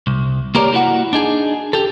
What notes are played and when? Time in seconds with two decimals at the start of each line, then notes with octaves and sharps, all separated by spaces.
0.07 C2
0.55 A#3 G4 A#4 C#5 D5
0.73 A#3 E4 F#4 F#5
1.13 D4 D#4 G#4
1.73 G4 A4